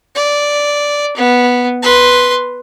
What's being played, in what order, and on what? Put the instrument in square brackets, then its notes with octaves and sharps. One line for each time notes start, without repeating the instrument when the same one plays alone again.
[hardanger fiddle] D5
B3
B4 C6